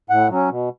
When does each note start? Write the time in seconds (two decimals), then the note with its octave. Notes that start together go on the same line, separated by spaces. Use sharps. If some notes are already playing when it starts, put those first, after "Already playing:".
0.10 A2 F#5
0.29 F#3 C#4
0.50 B2